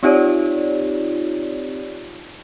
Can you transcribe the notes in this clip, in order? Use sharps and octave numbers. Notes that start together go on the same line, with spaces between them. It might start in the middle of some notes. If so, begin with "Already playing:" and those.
C4 D#4 F4 G4 C#5 D5